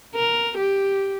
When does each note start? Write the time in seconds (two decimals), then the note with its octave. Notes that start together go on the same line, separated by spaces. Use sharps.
0.15 A#4
0.57 G4